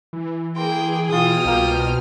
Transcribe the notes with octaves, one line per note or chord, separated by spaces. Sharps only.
E3
A#3 G#4 G5 C6
B2 E3 F4 G#4 G5 D#6 F6
C2 F3 A#3 C5